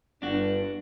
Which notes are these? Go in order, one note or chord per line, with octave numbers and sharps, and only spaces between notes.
G1 G2 D4 F#4